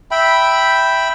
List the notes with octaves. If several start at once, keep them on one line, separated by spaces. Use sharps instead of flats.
E5 G5 B5